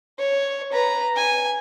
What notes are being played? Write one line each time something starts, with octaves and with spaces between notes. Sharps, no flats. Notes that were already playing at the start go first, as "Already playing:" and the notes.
C#5
B4 A#5
G#5